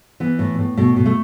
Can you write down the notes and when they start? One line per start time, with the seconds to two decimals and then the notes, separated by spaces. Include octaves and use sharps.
0.20 E3 B3
0.39 A2
0.59 A2
0.77 B2 A3
0.96 B2
1.06 A3